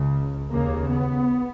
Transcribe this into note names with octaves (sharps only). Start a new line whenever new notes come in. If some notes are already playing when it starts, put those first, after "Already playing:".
Already playing: C#2 C#3
D#2 C#3 A#3
B3